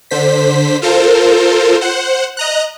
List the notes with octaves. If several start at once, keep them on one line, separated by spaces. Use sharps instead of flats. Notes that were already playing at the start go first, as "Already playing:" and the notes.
D3 C5 B6
F4 A4 A#4 C5
C5 F#5
D#5 A#5 F#6